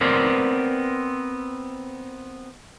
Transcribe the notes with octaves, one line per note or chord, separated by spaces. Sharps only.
B3 C4 A#4 D5